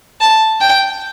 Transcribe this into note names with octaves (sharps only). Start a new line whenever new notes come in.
A5
G5